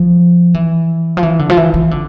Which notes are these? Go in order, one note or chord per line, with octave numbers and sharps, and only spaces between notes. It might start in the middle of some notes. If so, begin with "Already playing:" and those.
Already playing: F3
E3
F3
E3
D3
F3
E3
E3
D3